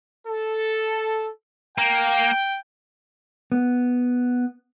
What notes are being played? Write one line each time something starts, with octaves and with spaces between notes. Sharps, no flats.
A4
A#3 G5
B3